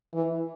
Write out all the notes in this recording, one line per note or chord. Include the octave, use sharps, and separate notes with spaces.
E3